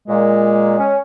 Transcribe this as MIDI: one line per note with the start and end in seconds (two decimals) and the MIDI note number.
0.08 0.77 46
0.08 0.96 56
0.78 0.99 61